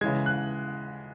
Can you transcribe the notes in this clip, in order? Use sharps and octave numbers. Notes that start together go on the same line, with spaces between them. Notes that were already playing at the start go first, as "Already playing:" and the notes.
C#3 E3 G#3 G#6
F#6